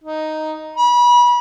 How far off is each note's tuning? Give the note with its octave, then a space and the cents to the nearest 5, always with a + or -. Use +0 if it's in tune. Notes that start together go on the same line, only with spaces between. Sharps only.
D#4 +0
B5 -30